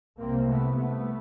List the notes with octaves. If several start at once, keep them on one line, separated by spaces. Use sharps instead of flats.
C2 C3 A#3 C4
A3 B3
A3 B3